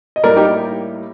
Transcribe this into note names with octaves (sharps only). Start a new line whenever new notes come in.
D#5
A2 G3 A#3 A#4 D5
D#4 G4